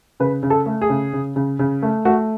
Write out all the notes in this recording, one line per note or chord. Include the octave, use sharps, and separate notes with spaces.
C#3 B4
C#3
A4
A3
G#4
C#3
C#3
C#3
C#3
A3
A3 F#4